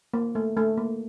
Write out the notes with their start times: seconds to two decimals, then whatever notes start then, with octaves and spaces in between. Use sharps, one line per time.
0.14 A#3
0.35 A3
0.57 A3
0.77 A#3